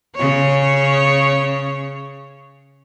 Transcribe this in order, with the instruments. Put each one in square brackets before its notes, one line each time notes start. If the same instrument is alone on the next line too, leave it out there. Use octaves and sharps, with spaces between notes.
[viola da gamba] C#3 C#5